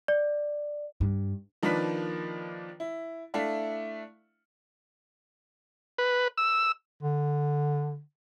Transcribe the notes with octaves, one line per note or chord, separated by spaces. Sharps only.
D5
G2
D#3 F3 A#3 D4 B4 B6
E4
A3 D4 E4 E5 F5
B4
E6
D3